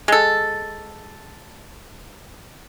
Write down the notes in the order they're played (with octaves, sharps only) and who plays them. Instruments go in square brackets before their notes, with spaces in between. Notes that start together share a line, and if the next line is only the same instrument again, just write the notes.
[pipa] G#3 A4